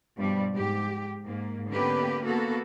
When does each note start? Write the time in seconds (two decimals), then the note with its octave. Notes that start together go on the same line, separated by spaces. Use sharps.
0.16 G2 B2 F3 G3
0.54 G#2 G4
1.24 G#2 A#3
1.68 D3 A#3 B3 C#4 G4 B4
2.23 A#3 B3 F#4 A4